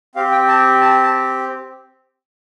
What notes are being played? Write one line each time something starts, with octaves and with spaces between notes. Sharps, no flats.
C4 G4 F5
G5
A5
A5
A5